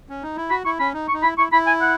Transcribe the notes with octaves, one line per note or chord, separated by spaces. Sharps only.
C#4
D#4
E4
F#4 B5
E4 C#6
C#4 B5
D#4
C#6
D#4
E4 B5
E4 C#6
E4 B5
G#5
F#5